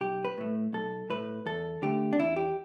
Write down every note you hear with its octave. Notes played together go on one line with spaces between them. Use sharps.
B1 G4
B4
A2 A3
B1 A4
A2 A3 B4
E2 A4
D3 A3 G4
D4
E2 E4
G4